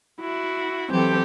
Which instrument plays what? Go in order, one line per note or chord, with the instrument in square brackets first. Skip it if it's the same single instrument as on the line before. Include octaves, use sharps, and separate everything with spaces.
[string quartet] E4 F#4
E3 F#3 C4 G4 A4